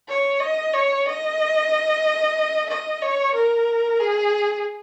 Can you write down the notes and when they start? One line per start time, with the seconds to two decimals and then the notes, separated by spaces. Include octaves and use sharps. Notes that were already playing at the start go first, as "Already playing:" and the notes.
0.08 C#5
0.40 D#5
0.73 C#5
1.06 D#5
2.69 D#5
3.02 C#5
3.34 A#4
4.00 G#4